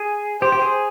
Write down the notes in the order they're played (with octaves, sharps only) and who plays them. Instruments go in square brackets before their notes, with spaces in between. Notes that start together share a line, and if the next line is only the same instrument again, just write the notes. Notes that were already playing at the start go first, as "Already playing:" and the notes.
Already playing: [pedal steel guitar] G#4
[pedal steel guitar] G4 [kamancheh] C5
[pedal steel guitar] G4
G#4